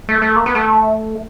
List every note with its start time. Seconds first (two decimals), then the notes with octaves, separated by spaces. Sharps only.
0.09 A3
0.22 A3
0.36 A#3
0.46 B3
0.55 A3